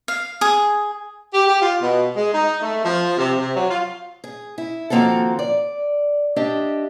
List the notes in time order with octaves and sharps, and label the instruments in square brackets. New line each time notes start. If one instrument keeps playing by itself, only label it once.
[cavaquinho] F5
G#4
[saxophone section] G4
G4
F4
B2
G#3
D#4
A3
F3
C3
C3
F#3
F4
[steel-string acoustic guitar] G#4
E4
D#3 F3 A#3 C4 F#4 A4
D5
D4 G4 D#5 E5